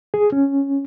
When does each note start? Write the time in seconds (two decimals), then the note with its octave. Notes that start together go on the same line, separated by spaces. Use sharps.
0.14 G#4
0.32 C#4